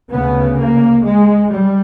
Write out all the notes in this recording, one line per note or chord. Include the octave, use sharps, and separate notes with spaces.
D2 C#3 B3
A#3
G#3
G3